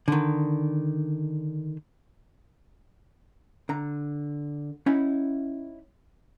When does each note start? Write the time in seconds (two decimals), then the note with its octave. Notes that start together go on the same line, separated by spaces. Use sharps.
0.08 D3 D#3
3.69 D3 A#5
4.86 C#4 D#4 E4 F#5 B5